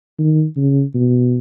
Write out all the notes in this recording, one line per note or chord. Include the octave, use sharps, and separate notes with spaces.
D#3
C#3
B2